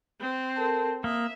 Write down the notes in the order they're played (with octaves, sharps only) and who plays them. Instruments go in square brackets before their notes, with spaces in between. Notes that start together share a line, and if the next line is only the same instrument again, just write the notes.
[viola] C4
[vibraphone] A4 A#4 A5
[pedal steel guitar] A#3 [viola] E5 [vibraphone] D#6